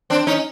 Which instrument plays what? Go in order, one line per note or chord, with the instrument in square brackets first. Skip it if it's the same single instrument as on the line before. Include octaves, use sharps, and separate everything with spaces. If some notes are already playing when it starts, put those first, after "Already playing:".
[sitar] C4 D4
C#4 D#4